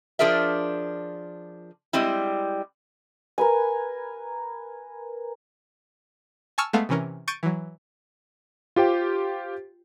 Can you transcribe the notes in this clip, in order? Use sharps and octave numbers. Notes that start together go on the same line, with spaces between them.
F3 D4 F4 G#4 A#4 E5
G3 G#3 C4 E4
A#4 B4 G#5
G#5 A5 C#6 E6 F6 A6
G#3 A3 B3 F5
C3 E3 C#4 A#4
C#6 G6 A6 D7 D#7
E3 F#3
F4 G4 C5 G5